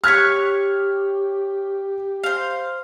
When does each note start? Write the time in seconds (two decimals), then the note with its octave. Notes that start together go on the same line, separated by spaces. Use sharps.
0.04 G4 C#5 F6 F#6 G#6 B6
2.24 C5 F5